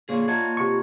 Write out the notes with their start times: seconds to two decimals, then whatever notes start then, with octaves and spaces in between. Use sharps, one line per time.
0.09 A#2 D3 D4 G#4 C#5
0.28 F4 D#5 F#5 A5 A#5 G#6
0.57 C3 G4 C#6